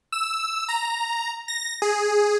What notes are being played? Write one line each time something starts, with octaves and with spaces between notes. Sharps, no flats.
E6
A#5
A#6
G#4